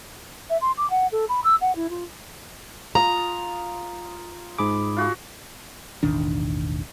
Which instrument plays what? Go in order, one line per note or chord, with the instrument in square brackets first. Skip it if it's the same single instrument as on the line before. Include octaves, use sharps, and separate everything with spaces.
[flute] E5
C6
D6
F#5
A4
B5
E6
F#5
E4
F4
[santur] F4 D#6 [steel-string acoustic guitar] A#5
[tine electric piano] G#2 B5 D6 [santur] G#4
[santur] F4 F#4 G#4
[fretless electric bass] E1 A1 D#3 D4